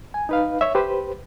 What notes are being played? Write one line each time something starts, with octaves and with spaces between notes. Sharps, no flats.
G#5
D#4 B4 F5
C#5 E5
G4 B4 C5